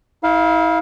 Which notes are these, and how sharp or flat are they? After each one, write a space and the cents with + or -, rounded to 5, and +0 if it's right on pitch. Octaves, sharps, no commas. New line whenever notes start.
E4 -35 F5 +0